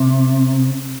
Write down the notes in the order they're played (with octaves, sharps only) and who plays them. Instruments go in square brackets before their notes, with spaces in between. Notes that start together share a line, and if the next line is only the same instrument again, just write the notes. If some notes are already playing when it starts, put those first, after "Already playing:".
Already playing: [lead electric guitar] C3